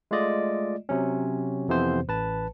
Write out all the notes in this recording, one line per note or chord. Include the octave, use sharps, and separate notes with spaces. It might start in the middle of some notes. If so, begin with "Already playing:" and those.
G#3 A3 F4 D5 D#5
C3 F#3 C#4
F2 C3 E3 B3 C5
A1 B4 A5